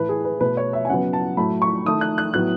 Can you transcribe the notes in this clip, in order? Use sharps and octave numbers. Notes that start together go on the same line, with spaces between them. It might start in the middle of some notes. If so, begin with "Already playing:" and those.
Already playing: A2 E3 A3 B4
G#4
B4
B2 A3 B4
C#5
E5
G#5
C#3 F#3 B3 F#5
A5
A2 F#3 A3 B5
C#6
D#3 A3 D#6
F#6
F#6
A2 F#3 B3 F#6